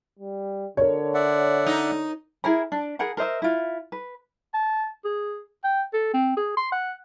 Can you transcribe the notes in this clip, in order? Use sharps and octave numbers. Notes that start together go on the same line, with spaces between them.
G3
D3 A#4 C#5
D5 E5 F#5
D#4
E4 G#4 A#4 B5
D4
G#4 A#4 F#5 B5
A#4 C5 D#5 E5
E4 F4
B4
A5
G#4
G5
A4
C4
G#4
C6
F#5